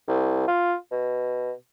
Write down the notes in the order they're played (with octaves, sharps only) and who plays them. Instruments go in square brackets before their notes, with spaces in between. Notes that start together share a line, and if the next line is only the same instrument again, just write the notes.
[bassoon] C2
F4
B2